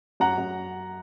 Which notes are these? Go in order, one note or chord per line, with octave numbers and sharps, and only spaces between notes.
F#2 F#5 A#5
F#2